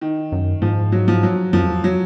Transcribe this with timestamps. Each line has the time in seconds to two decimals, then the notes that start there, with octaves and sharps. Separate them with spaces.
0.01 D#3
0.32 F#2
0.62 G#2 F3
0.92 F#3
1.08 F3
1.23 F#3
1.53 F#2 F3
1.63 F2
1.84 F#3